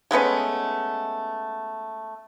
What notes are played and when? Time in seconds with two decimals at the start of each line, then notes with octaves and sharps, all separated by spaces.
0.11 G#3 A3 B3 C#4